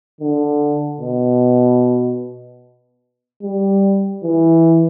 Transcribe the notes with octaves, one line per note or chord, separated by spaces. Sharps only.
D3
B2
G3
E3